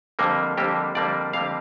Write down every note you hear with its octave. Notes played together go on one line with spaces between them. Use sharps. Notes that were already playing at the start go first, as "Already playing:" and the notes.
F2 D3 G3 A#3
F2 D3 G3 A#3 G4
F2 D3 G3 A#3 D5
F2 D3 G3 A#3 F5